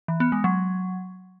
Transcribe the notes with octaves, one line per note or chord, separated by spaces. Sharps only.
E3
B3
G#3
F#3